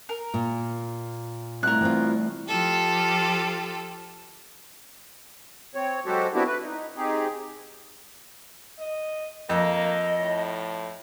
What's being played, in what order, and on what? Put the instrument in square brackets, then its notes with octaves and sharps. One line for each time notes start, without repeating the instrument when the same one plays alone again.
[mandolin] A#4
[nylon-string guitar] A#2
[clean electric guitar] C2 A2 [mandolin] A#4 F#6
[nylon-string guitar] E3 C4 F4
[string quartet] F3 F4 G4 A4
[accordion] C4 C#5
F#3 G#3 F#4 G4 A4 C5
B3 C4 D4 E4 F#4 G4
B4
D#4
C4 D#4 G4 G#4
[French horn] D#5
[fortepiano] F2 [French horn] A#3 [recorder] D#5
[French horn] A2